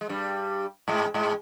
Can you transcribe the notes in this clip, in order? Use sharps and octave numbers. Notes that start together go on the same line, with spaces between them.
G#3
G2 G3
G#2 G#3
G#2 G#3